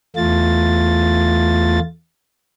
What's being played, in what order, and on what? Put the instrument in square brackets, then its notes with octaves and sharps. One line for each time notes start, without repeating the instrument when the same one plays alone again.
[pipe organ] E2 A3 F4 A6